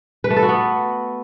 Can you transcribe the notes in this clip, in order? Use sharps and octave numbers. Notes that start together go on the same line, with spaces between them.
B4
A3
A4
F#4
B3